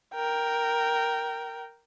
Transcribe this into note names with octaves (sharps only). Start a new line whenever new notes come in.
A#4 G5